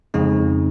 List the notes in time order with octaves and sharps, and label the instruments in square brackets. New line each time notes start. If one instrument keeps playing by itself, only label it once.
[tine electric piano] F2 C#3 G#3 C4 D#4